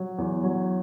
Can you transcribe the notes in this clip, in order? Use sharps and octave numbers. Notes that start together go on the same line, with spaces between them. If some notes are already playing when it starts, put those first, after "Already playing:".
Already playing: F#3
E2
F#3